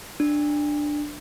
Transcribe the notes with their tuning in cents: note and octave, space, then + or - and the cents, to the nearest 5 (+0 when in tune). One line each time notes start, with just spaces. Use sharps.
D4 +10